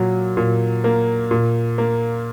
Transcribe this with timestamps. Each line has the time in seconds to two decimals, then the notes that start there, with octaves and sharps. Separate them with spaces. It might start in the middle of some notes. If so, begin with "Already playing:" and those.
Already playing: A#2 F#3
0.37 A#2
0.84 A#3
1.31 A#2
1.78 A#3